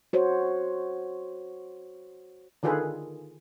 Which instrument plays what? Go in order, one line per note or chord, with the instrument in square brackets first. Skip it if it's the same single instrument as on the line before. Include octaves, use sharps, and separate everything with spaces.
[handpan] F#4 C5 C#5
[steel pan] D3 D#3 F4 G#4 A4 B4